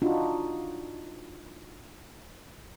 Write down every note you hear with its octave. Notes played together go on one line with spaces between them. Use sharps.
D4 D#4 F4 F#4